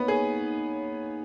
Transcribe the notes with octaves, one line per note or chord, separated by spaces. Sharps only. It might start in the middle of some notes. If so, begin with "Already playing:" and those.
Already playing: A#3 B3 D#4 C#5
G#4